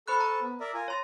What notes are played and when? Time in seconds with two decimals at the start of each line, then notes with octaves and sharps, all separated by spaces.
0.08 A4 C5 A5 B5 C#6 F#6
0.20 A#5
0.41 B3
0.60 A#4 D5 E5
0.74 F4 A#4 G#5
0.88 C#5 A#5 C6 A6